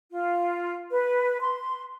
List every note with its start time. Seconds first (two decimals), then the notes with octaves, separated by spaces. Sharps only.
0.12 F4
0.91 B4
1.41 C6